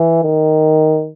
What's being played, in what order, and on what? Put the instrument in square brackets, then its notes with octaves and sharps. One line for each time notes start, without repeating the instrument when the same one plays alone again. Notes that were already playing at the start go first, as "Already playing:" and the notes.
Already playing: [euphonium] E3
D#3